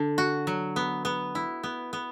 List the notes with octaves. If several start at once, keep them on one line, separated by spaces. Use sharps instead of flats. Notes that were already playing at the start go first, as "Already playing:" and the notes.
Already playing: D3
F#4
F#3
B3
B3
E4
B3
B3